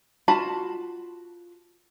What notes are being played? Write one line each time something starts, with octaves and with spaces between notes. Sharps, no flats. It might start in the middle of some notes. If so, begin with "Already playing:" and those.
F4 F#4 A5 B5